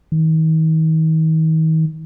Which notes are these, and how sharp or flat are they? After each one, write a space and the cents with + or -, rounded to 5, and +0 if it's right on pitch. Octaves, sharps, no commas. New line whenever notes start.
D#3 +40